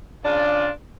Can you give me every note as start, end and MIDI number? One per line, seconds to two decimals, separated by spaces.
0.23 0.68 49
0.23 0.68 62
0.23 0.68 65